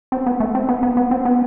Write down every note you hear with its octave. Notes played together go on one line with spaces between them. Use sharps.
C4
B3
A3
C4
B3
B3
B3
C4
B3